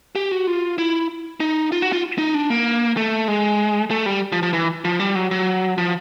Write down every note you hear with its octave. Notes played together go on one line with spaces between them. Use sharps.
G4
F#4
F4
E4
D#4
F4
F#4
F4
D#4
D4
A#3
A3
G#3
A3
G3
F3
F3
E3
F3
G3
F#3
F#3
F3